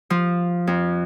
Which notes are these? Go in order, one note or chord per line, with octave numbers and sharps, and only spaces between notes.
F3
F2